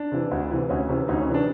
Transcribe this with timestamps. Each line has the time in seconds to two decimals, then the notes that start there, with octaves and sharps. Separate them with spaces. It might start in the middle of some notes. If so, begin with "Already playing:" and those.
Already playing: D4
0.12 C3 E3
0.31 D2
0.51 C3 E3
0.69 D2 C#4
0.89 C3 E3 C#4
1.08 D2 D#4
1.21 C#4
1.28 C3 E3
1.34 D4